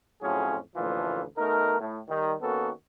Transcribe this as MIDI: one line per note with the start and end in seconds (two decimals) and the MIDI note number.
0.22 0.57 41
0.22 0.57 45
0.22 0.57 54
0.22 0.57 61
0.22 0.57 65
0.22 0.57 68
0.76 1.22 33
0.76 1.22 38
0.76 1.22 46
0.76 1.22 52
0.76 1.22 53
0.76 1.22 65
1.38 1.77 47
1.38 1.77 57
1.38 1.77 63
1.38 1.77 70
1.80 2.00 45
2.09 2.34 51
2.09 2.34 55
2.42 2.70 51
2.42 2.70 58
2.42 2.70 59
2.42 2.70 61
2.42 2.70 66
2.42 2.70 69